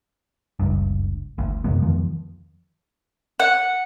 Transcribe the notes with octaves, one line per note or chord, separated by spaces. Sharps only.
F#1 C#2 G2
G1 D2
F#2 C3 G#3 B3
F2 D#3 F3
F#5